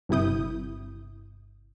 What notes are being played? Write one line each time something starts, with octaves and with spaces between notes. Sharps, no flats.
G1 G2 C3 E4 D#6 G6